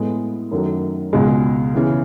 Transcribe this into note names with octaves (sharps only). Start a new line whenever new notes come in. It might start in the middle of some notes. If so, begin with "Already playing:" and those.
Already playing: A2 G#3 B3
F#2 D#3 F#3 A3
C#2 B2 G#3
C#3 E3 B3